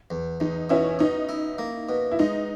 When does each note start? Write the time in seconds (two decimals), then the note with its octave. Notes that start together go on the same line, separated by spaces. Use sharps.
0.10 E2
0.40 E2 D#4
0.70 B2 C#4 E4
0.99 B2 D#4
1.29 E4
1.59 A#3
1.89 B2
2.11 E4
2.19 G#3 D#4